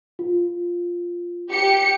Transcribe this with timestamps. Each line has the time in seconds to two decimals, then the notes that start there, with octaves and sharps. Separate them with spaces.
0.19 F4
1.50 G4 C#7